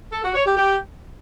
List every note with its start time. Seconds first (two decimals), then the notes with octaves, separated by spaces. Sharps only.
0.12 A4
0.23 F#4
0.35 C#5
0.46 G4
0.57 G4